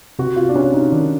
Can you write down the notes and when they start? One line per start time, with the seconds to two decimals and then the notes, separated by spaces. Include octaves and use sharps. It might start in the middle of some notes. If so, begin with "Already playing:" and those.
0.19 C3 F#4
0.36 F4
0.49 D4
0.55 C3 C#4
0.74 D#4
0.92 D#3 D4